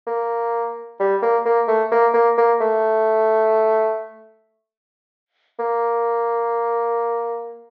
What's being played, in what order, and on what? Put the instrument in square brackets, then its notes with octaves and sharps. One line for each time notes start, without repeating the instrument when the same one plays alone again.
[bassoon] A#3
G3
A#3
A#3
A3
A#3
A#3
A#3
A3
A#3